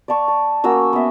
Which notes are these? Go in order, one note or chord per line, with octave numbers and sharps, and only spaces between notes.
D5 F5 A5 C#6
A5
A#3 C#4 F#4 E6
B3 E5